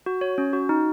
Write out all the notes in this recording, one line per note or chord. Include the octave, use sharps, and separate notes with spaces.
F#4
C#5
C#4
F#4
D#4